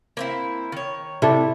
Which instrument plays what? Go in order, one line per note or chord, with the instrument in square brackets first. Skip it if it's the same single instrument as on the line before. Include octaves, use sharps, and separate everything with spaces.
[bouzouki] A#3 C4 E4
D#3 C#5
[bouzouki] C3 [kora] E4 A4 D5